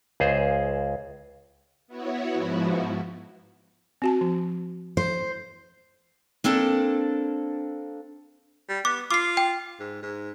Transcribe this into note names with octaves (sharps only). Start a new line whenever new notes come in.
C#2 G#4 C5
B3 E4 F#4 C#5
G#2 F3 B3 E4 F#4
C4 F#4 A5
F3
C5
A#3 C4 D4 A4
G3
B3 D6
F4 D6 C7
G5
G#2
G#2